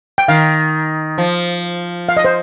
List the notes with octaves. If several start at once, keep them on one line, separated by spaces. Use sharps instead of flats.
G5
D#3 F5
F3
F5
D#5
C5